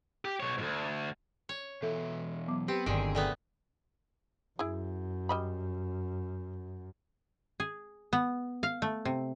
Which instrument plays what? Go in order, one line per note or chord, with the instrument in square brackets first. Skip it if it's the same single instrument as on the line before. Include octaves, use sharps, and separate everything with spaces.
[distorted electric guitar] G4
B2 C#5
D2 G#2
[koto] C#5
[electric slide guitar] B2 E3 E5 [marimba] A4
[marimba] F#3 B3 D6
[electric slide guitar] B3 [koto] C4 [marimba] G4
[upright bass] G1 [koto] A#2 D3 D#3 [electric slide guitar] G#4
[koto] A#2 A3 B3 [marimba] A4 D5 G5
[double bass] F#2 [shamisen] E4 G#4
[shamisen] G3 D#5 B5
[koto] G#4
B3
F5
A3
C3